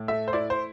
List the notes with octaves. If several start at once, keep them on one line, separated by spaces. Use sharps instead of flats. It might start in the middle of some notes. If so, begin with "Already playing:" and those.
Already playing: A2
A3 E5
C5
E4 D5
C5